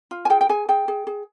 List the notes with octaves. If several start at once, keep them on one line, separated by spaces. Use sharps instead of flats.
F4
G#5
G#4 G5
G5
G#4 G#5
G#4 G5
G#4
G#4